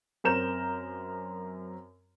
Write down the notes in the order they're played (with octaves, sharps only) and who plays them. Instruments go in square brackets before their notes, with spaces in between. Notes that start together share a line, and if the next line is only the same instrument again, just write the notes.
[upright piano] F#2 C4 A#4 A#5 G6 E7